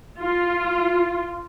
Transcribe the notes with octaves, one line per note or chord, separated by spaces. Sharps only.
F4